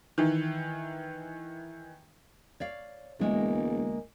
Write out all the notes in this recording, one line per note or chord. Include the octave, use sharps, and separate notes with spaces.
D#3 E3
C#5 D5 F5
E1 D2 G#3 A#3